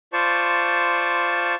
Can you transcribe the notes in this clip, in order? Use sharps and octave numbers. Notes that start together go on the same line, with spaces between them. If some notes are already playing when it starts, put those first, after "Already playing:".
F4 C5 D5 A5 C#6